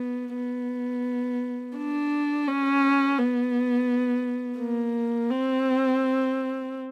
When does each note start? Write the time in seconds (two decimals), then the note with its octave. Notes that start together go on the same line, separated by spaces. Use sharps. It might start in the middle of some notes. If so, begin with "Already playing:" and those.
Already playing: B3
0.36 B3
1.77 D4
2.48 C#4
3.18 B3
4.59 A#3
5.30 C4